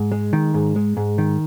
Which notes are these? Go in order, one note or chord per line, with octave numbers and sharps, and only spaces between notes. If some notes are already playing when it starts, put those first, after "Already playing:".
Already playing: G#2
G#3
D#3
G#2
G#3
G#2
D#3